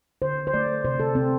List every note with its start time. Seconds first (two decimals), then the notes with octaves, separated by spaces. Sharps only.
0.22 D3 C5
0.47 C5
0.54 A3 D5
0.85 C3 C5
1.00 A4
1.15 C3 C4